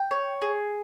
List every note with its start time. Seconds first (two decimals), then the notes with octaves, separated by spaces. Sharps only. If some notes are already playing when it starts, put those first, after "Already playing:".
Already playing: G5
0.11 C#5
0.42 G#4